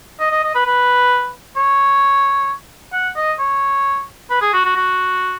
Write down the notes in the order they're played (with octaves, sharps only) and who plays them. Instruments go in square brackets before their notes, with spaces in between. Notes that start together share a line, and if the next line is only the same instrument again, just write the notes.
[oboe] D#5
D#5
D#5
B4
B4
C#5
F#5
D#5
C#5
B4
G#4
F#4
F#4
F#4